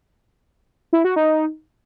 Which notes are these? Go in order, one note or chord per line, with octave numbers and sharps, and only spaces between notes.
E4
F#4
D#4